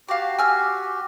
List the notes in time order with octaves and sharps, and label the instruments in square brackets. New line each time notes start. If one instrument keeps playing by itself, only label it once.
[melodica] F#4 G4 [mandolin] F5 A5
[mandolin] G#5 E6 F6